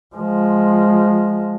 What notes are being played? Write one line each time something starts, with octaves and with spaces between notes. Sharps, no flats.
F3 G#3